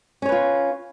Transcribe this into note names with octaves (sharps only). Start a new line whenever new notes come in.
C#4 F4 B4 C#5